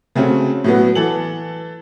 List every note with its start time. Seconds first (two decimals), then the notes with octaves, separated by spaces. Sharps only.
0.15 C#3 A3 C4 C#4 F#4
0.64 A2 F#3 B3
0.95 E3 A4 F#7